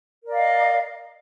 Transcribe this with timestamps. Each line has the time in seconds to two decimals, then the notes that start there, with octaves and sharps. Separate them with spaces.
0.23 A#4
0.28 D5
0.32 F5
0.36 D#5